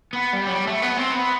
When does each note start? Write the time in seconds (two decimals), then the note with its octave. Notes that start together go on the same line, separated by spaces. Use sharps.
0.13 B3
0.33 G3
0.46 F#3
0.52 G3
0.67 A3
0.82 B3
0.97 C4
1.12 B3